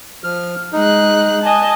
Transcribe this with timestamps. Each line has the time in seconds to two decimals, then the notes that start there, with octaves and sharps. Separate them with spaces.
0.24 F3 F6
0.73 G#3 D#4 F#6
1.42 D#5 G#5 A5